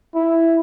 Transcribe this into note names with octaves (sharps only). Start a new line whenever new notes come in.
E4